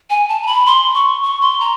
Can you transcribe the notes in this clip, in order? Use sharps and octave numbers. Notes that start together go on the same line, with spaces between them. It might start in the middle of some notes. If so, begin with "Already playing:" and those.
G#5
A5
A#5
B5
C6
C#6
C#6
C6
A#5